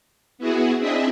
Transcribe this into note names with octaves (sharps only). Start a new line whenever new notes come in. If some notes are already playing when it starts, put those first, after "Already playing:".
B3 E4 F#4 G#4
C4 D4 E4 G#4 D#5 E5